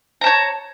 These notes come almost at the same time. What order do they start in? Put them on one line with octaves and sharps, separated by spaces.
A#5 A5 C#5